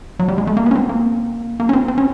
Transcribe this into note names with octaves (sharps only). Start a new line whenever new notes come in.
F#3
G3
G#3
A3
A#3
B3
C#4
C4
A#3
A#3
C#4
C4
C4
C#4